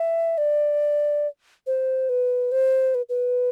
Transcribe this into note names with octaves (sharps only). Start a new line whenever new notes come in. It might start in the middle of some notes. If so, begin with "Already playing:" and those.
Already playing: E5
D5
C5
B4
C5
B4
B4